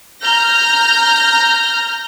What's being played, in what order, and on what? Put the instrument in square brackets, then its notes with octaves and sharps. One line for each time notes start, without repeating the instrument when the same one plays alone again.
[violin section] A#5 F6 G6 A#6